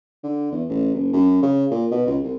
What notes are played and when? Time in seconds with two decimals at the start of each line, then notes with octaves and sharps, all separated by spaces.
0.23 D3
0.52 E2
0.69 A1
0.94 F#1
1.13 F#2
1.43 C#3
1.71 A#2
1.91 B2
2.07 C#2
2.23 C2